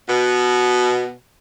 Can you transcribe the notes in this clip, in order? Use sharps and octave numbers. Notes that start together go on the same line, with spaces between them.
B2